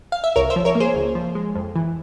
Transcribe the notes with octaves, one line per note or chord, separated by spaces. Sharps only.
F5
E5
C2 A#4 C#5
C5 E5
F3
A#4 C#5
A#3
G#4 C5
C#2
F3
G#3
F2
E3